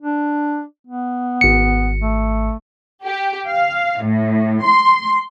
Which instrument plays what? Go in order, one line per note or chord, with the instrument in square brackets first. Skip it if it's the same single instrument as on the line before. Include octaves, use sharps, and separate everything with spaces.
[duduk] D4
B3
[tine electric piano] G#1 C#7
[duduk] A3
[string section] G4
F5
A2
C6